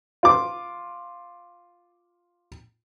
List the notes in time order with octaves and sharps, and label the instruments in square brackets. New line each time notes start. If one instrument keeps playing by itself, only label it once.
[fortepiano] F4 D6